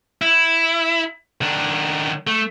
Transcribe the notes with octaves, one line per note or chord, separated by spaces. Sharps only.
E4
D#3 D4
A3